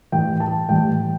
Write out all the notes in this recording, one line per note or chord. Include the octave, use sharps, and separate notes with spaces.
A2 E3 G3 G5
A5
A2 E3 G3 G5